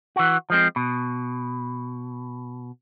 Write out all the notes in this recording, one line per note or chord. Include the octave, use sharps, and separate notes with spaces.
E3 F#4
F3 G#3 C4
B2